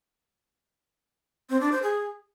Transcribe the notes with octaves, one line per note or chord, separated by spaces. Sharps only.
C4
D4
C5
G#4